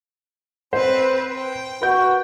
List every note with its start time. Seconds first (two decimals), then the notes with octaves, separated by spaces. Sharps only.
0.73 C4 B4 C5
1.32 G5
1.82 F#4 B4 G6